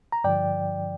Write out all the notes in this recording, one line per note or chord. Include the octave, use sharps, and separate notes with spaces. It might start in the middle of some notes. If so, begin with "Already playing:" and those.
A#5
G2 D3 F3 D5 G5